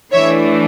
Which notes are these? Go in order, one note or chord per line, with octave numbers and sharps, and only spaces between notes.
E3 A3 D4 C#5 E5